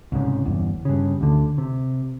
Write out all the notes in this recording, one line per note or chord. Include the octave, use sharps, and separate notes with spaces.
C2 G#2 C#3
G1 E2
G2 C#3
D2 D3
C3